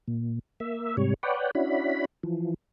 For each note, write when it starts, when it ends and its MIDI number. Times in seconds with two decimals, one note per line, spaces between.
0.08 0.39 46
0.60 0.96 58
0.60 0.96 76
0.97 1.14 44
0.97 1.14 48
0.97 1.14 55
0.97 1.14 73
1.23 1.51 71
1.23 1.51 73
1.23 1.51 74
1.23 1.51 78
1.23 1.51 79
1.55 2.05 61
1.55 2.05 62
1.55 2.05 64
1.55 2.05 66
1.55 2.05 83
2.23 2.54 52
2.23 2.54 53